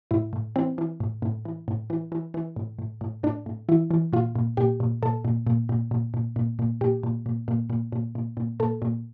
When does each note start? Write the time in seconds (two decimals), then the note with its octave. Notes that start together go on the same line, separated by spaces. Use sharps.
0.11 A2 E4
0.33 A2
0.56 E3 C4
0.78 E3
1.00 A2
1.22 A2
1.45 E3
1.68 A2
1.90 E3
2.12 E3
2.34 E3
2.56 A2
2.79 A2
3.01 A2
3.23 A2 D4
3.46 A2
3.69 E3 E4
3.91 E3
4.13 A#2 F4
4.36 A#2
4.57 A#2 G4
4.80 A#2
5.03 A#2 A4
5.25 A#2
5.47 A#2
5.69 A#2
5.91 A#2
6.14 A#2
6.36 A#2
6.59 A#2
6.81 A#2 G4
7.03 A#2
7.26 A#2
7.48 A#2
7.70 A#2
7.92 A#2
8.15 A#2
8.37 A#2
8.60 A#2 A4
8.82 A#2